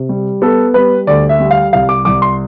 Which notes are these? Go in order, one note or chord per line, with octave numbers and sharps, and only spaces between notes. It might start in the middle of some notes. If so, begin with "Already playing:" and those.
Already playing: C3
G3
B3 A4
G3 B4
D2 D5
E5
G3
F5
C2 F5
D6
C2 D6
C6